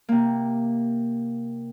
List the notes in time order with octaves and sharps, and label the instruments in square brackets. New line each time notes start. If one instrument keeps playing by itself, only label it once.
[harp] C3 A#3